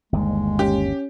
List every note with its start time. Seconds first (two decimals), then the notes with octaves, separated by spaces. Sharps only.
0.13 G1 D#2 G#3
0.59 C#4 G4